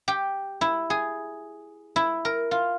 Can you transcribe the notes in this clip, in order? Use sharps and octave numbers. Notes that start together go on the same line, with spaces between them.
G4
E4
G#4
E4
A#4
F4